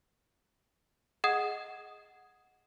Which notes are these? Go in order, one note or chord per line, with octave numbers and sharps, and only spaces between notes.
G#4 D#5 F#5 D#6 G#6